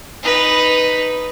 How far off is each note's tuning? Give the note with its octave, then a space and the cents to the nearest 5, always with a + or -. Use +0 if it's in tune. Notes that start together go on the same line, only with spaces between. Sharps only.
D#4 +0 B4 +0